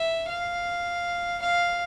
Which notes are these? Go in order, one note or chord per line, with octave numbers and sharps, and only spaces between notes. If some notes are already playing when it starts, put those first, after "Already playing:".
Already playing: E5
F5
F5